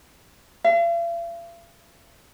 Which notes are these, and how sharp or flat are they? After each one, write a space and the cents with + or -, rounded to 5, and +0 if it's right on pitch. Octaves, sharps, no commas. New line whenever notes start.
F5 -45